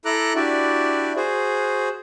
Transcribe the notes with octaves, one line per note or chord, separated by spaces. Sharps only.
E4 A4 A#5 D6 F#6
D4 E4 F#4 G4 D5
F#4 G#4 C5